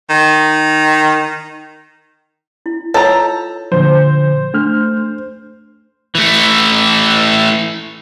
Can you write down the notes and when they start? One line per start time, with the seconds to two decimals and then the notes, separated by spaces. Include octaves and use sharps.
0.10 D#3
2.66 E4
2.94 F4 A4 C#5 A#5
3.72 A#2 D3 F3 C5
4.54 A3 D4 F6
6.15 E3 A3